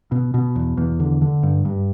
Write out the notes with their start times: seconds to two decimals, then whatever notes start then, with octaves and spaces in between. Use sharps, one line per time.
0.12 B2
0.34 B2
0.56 E2
0.77 E2
1.00 D3
1.22 D3
1.43 G2
1.65 G2